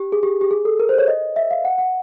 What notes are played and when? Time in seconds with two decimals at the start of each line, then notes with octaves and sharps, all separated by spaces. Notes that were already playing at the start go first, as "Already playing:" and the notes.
Already playing: G4
0.12 G#4
0.23 G4
0.41 G4
0.51 G#4
0.65 A4
0.80 A#4
0.89 C5
0.98 C#5
1.08 D#5
1.36 E5
1.51 F5
1.65 F#5
1.78 F#5